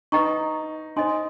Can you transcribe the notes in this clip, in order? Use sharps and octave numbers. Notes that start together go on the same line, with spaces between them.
D#4 B4 D#5 G5 A#5 C#6
D#4 C5 D#5 G#5 C6